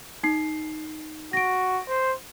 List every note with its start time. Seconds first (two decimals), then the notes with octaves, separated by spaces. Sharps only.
0.23 D#4 C7
1.33 F#4 A#6 D7
1.88 C5